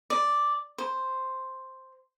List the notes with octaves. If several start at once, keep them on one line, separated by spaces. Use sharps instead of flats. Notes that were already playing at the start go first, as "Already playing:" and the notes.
D5
C5